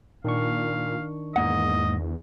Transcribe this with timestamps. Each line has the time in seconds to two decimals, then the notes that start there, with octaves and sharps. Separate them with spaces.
0.24 A#2 D#3 D4 F5 C#6
1.36 E2 G#2 A#3 D#5 F#5